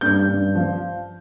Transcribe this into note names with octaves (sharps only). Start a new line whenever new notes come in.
G2 G6
G2
F3